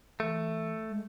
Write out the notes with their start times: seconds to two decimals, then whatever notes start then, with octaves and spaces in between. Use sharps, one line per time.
0.20 E3 A3
0.90 G#3